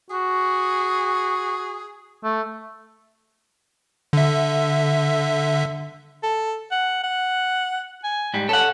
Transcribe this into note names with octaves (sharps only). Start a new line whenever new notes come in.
F#4 G#4
A3
D3 E5
A4
F#5
F#5
G#5
G#2 G3
C#4 A4 F#5